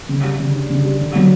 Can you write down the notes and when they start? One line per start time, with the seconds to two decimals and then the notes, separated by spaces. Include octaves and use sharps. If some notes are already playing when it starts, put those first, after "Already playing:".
0.09 C#3
0.23 G3
0.40 C#3
0.54 D4
0.69 C#3
0.85 G3
1.00 D3
1.15 F#3